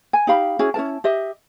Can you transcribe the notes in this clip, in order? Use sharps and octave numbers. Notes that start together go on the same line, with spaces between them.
G#5
D#4 G4 F5 B5
C#4 E4 F#4 G#4
C#4 E4 A#4 A5
G4 D#5 E5